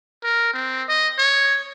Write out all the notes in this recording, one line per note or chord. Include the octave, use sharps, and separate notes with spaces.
A#4
C4
D#5
C#5